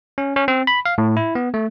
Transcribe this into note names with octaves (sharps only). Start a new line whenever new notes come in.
C#4
C#4
C4
B5
F5
A2
E4
B3
A3